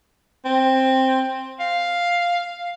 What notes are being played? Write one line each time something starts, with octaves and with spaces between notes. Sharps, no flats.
C4
F5